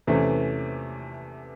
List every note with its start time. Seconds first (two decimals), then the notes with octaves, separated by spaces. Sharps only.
0.07 E2 C3 E3 A3 C#4